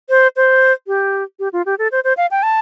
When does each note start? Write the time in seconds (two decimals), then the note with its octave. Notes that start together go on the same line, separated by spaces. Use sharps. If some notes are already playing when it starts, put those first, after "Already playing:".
0.09 C5
0.36 C5
0.87 G4
1.39 G4
1.53 F4
1.66 G4
1.79 A4
1.92 C5
2.04 C5
2.17 F5
2.31 G5
2.43 A5